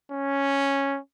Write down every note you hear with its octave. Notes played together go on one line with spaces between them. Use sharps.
C#4